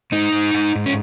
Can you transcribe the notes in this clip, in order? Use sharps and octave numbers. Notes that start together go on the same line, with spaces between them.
G#2 D#4
G#2
G#2
G#2
C#4